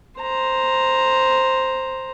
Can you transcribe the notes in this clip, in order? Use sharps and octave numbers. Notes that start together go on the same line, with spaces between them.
C5 A#5